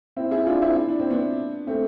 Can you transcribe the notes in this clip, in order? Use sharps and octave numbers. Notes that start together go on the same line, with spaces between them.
C4 E4
E4 G#4
D4 F4
C4 E4
E4
D4
C4
B3 D4
A3 C4